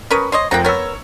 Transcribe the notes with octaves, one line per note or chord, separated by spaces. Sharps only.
C#4 A#4 B4 B5 C#6 D#6
C5 C#5 D#5 C6
F1 F2 A#3 C4 F#5 A#5
B3 A#4 C#5 E6